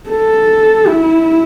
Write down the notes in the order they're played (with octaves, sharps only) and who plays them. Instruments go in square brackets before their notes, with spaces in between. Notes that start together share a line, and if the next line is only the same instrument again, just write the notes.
[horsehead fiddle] A4
E4